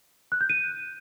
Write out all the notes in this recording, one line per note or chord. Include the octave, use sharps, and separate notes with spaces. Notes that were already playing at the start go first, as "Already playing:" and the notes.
F#6
G6
D#7